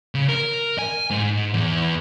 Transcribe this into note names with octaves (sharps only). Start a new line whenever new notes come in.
C#3
A#4
G#5
G#2
E2